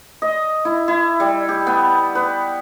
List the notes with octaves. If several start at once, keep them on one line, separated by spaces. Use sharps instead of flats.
D#5
E4
E4
G3
G4
B3
B4